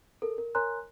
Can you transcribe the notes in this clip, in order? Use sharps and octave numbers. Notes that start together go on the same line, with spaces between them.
A4 A#4
A#4
A#4 C#5 G#5 A#5 C6 F#6